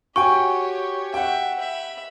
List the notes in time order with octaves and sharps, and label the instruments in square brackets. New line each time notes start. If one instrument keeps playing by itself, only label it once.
[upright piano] F#4 G5 G#5 [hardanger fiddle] G4 C#5 [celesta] C#6
[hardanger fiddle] E5 [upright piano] F#5 G5
[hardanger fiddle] E5 B5